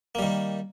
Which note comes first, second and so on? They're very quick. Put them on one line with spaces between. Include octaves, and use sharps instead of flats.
A#3 G3 D#3